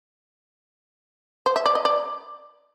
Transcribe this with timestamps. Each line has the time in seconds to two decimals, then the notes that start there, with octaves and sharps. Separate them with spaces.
1.46 C5
1.56 E5
1.66 D5
1.75 D#5
1.85 D5